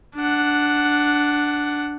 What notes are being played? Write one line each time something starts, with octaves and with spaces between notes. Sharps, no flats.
D4 F#5